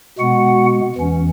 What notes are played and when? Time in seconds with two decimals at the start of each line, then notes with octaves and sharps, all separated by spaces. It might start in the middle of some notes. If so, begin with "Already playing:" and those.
0.19 B2 G#3 B3 F#4 F#5
0.96 E2 E3 C#4